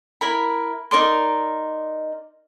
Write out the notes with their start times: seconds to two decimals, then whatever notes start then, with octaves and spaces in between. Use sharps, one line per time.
0.21 E4 A#4 B5
0.91 D#4 A#4 D5 C6